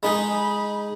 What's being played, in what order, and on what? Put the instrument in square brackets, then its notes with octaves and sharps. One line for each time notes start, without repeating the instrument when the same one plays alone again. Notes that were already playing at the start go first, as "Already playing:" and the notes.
[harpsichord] G#3 D#4 G#4 [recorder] B5